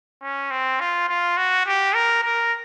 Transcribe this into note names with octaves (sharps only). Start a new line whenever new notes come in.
C#4
C4
F4
F4
F#4
G4
A#4
A#4